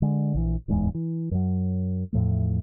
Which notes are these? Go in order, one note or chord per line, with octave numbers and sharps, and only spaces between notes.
D3 G#3
A#1 E3
D1 E2 G#2 G#3
E3
F#2 F#3
E2 A2 F3 A3